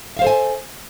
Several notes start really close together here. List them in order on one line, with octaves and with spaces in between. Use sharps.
E5 F5 C5 A4 G#5